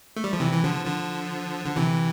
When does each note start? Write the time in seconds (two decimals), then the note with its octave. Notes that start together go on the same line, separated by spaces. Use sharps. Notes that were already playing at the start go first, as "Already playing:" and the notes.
0.16 A3
0.24 G3
0.33 F3
0.40 C3 E3
0.53 E3
0.63 D3 F3
0.85 D3 F3
1.66 D3
1.76 C3 E3